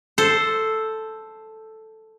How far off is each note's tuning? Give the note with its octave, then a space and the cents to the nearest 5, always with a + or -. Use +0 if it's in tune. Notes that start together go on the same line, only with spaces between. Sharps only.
A4 +0 C5 +0